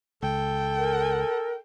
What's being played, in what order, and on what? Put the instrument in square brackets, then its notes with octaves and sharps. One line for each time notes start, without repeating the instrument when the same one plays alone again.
[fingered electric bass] C#2 [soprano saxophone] A4 [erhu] G5
[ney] A#4